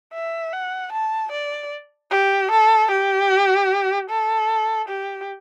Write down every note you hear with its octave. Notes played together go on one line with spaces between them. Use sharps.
E5
F#5
A5
D5
G4
A4
G4
A4
G4